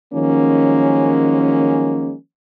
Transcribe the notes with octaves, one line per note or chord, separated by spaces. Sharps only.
D#3 F3 F#3 G#3 A#3 C#4